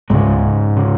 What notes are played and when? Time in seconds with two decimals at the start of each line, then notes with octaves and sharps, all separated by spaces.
0.10 C#2 G#2 C#3 G#3
0.77 C#3